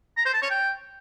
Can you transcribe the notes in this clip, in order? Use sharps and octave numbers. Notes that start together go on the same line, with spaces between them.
A#5
C5
A5
C#5
G5